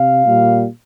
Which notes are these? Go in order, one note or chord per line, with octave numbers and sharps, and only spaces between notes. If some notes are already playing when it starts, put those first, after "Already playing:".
Already playing: C3 F5
A#2 G3